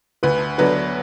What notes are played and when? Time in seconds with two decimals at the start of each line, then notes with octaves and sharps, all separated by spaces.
0.23 D2 B4
0.58 D3 F#3 B3 D4 B4